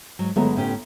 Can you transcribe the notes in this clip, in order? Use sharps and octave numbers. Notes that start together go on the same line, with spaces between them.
G#2 F#3
G1 F#3 G#3 A3 B3 A#5
A2 C#4 G4